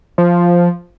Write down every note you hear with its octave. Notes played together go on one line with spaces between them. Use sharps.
F3